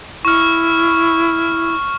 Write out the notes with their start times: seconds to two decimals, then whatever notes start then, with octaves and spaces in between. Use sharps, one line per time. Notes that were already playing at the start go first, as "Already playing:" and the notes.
0.25 E4 C#6 F6